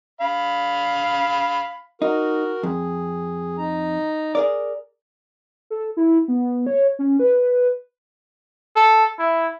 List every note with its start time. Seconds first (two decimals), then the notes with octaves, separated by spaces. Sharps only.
0.21 F5 B5
2.02 D#4 F#4 A#4
2.63 F2 G#4
3.58 D#4 A#5
4.35 G#4 A#4 D5
5.70 A4
5.97 E4
6.28 B3
6.67 C#5
6.99 C#4
7.19 B4
8.76 A4
9.19 E4